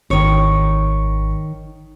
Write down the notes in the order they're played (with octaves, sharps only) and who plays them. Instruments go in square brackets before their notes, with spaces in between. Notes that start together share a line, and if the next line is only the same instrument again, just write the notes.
[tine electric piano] G#1 C#6 [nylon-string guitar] D#3 C#5